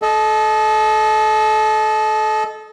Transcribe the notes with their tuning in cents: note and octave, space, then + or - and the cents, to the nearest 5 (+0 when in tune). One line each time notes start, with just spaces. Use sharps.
A4 -25 D#5 +0